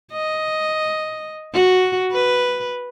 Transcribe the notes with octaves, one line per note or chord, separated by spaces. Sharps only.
D#5
F#4
B4